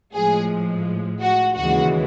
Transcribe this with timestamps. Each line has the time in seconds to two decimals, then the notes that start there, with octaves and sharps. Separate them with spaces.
0.14 A2 F3 G#3 G#4
1.22 F#4
1.57 D#2 C#3 E3 G#3 F#4